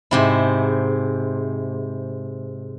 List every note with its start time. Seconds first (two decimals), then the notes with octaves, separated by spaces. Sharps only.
0.11 G#2 C3 E4